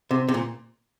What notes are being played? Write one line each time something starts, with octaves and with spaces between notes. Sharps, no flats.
C3
C3
A#2